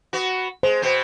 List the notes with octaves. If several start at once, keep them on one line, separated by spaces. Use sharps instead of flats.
B3 F#4
G#3 C5
B2 C4